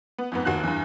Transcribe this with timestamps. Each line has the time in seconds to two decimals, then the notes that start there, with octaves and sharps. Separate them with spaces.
0.18 B3
0.32 F2 G#2 B3
0.45 F1 D#2 F#4 F#6
0.63 E2 G2